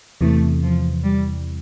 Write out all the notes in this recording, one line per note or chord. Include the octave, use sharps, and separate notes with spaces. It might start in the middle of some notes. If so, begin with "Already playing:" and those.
E2 C3 E3 A3
F3
G3